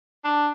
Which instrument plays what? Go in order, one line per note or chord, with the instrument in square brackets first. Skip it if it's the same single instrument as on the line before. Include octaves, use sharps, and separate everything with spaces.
[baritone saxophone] D4